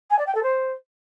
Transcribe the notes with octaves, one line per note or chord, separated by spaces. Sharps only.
G#5
D5
G5
A4
C5